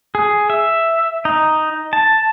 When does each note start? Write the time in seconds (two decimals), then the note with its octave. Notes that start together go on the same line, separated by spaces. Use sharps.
0.15 G#4
0.50 E5
1.25 D#4
1.93 A5